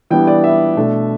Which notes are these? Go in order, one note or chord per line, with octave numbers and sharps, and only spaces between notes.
E3 G3 B3 D4 G5
D5
E5
B2 A3 D4